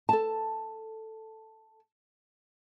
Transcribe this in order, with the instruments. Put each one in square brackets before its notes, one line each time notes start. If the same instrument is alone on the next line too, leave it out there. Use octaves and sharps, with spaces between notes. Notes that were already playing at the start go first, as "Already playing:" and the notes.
[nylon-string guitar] A4 A5